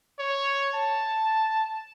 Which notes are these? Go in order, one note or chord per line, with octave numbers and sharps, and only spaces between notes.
C#5
A5